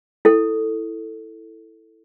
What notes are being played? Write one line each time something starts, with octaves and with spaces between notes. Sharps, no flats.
E4 A4